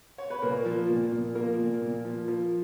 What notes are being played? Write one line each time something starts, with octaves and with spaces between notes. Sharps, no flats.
C#5
B4
A#2 A#3 A#4
F3
A#2
A#2
F3 A#3 A#4
A#2
A#2
F3
F3